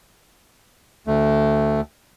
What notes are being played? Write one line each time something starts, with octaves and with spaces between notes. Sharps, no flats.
D2 A3